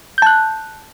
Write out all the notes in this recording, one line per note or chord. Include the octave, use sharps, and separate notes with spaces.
A5 F#6 G6